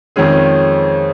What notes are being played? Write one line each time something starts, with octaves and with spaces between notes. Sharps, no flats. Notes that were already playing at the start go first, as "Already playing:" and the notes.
F2 D#3 G#3 C#4 G#4